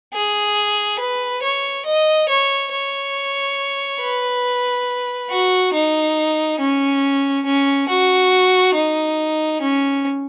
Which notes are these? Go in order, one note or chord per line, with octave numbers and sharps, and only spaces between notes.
G#4
B4
C#5
D#5
C#5
C#5
B4
F#4
D#4
C#4
C#4
F#4
D#4
C#4